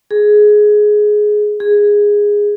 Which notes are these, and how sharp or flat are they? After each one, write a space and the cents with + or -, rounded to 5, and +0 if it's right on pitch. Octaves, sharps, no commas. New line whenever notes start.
G#4 +15
G#4 -10